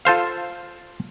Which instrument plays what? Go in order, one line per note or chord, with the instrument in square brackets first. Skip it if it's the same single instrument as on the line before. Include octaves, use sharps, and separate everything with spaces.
[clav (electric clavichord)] F4 A4 C5 F5